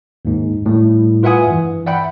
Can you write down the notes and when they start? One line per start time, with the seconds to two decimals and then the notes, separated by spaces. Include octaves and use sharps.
0.25 D#2 G#2
0.66 A2 G3
1.23 F4 B4 E5 F#5 G#5 D#6
1.47 G2 E3
1.86 D5 E5 F#5 G5 B5